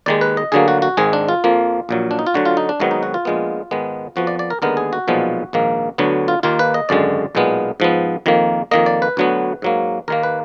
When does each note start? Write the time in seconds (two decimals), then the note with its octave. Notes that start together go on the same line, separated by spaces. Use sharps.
0.06 D#2 D#3 G#3 D5
0.21 B4
0.37 D#5
0.52 D2 D3 F#3 A#3 G#4
0.68 F#4
0.82 F#4
0.97 G#1 G#2 D#3 G#3 G#4
1.13 D4
1.28 F4
1.44 F2 F3 A#3
1.89 A#1 A#2 F#3
2.11 D4
2.19 D#4
2.27 F4
2.34 D2 D3 F#3 F#4
2.46 F4
2.57 D#4
2.69 D4
2.80 G#1 G#2 D#3 F#3 B3
2.91 D#4
3.03 F#4
3.14 F4
3.25 A#1 A#2 G#3 B3
3.71 G#2 D#3 G#3 B3
4.16 F2 F3 B3 F#4
4.27 D5
4.39 D5
4.50 A#4
4.62 D#2 D3 G#3 B3 A#4
4.77 G#4
4.93 F#4
5.08 B1 A#2 F3 G#3 B3
5.53 A#1 G#2 D#3 A#3
5.98 D2 D3 F#3 B3
6.28 F4
6.43 D#2 D#3 A#3 F4
6.59 B4
6.74 D#5
6.89 G#1 F#2 D3 G#3 D5
7.35 B1 A#2 G#3 B3
7.80 G#2 F3 B3
8.26 F2 D#3 A#3
8.71 F2 D#3 A#3 D#5
8.86 D5
9.02 B4
9.17 D2 D3 F#3 B3
9.62 G#2 F#3 A#3
10.08 D#2 D#3 A#3 A#4
10.23 B4